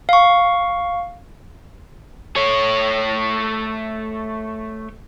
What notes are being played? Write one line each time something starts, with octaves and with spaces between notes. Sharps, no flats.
F5 C#6
A3 C#5